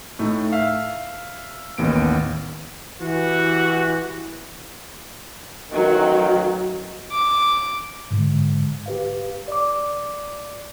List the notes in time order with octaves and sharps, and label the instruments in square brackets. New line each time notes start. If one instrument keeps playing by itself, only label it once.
[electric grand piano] A2 A3 D#4
E5 F5
A1 D#2 B3 D7
[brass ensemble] E3 G4 [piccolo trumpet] F#4
[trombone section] A1 D#3 [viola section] F#3
[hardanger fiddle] D6
[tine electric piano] G#2 D3 G#3
G4 B4 F5
D5 D6